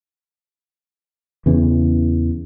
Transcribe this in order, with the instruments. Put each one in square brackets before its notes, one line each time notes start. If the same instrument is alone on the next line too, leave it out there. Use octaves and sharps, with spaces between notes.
[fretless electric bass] E2 C#3 E3